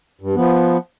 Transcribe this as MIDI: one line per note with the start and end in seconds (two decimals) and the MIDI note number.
0.21 0.35 43
0.35 0.77 53
0.35 0.77 59